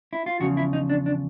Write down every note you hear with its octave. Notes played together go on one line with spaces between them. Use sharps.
E4
F4
E2 C#3 F3 F#4
E4
D#4
D4
D4